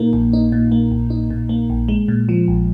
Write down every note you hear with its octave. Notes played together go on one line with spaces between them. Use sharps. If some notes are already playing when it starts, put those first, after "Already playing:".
Already playing: A#2 A#3 D#4
A#1
D#4
A#2
A#3
A#1
D#4
A#2
A#3
A#1
G#3
A#2
F3
A#1